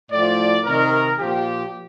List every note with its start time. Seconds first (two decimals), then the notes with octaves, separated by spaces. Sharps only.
0.11 A2 F3 D5
0.65 C3 D#3 A#4
1.19 A#2 F3 G4